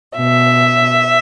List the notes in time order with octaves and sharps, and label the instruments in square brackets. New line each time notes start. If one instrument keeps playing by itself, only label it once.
[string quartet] B2 E5